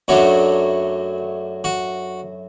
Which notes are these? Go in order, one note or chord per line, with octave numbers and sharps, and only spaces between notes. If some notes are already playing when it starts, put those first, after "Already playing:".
F#2 F#3 A3 D4 F#4
F#4